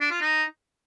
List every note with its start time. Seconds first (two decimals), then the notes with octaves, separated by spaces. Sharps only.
0.01 D4
0.11 F4
0.21 D#4